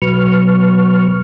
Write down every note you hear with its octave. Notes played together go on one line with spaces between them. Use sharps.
B2 F#3 B4 C#6 F6